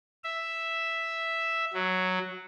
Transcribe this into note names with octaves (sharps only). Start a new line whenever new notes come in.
E5
F#3